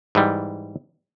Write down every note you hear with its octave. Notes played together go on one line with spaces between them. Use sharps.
G#2 E3 G3